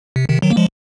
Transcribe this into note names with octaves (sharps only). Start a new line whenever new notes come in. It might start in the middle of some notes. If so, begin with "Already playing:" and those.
C3
C3 D#3
D#3 F#3
A#3
F3 G#3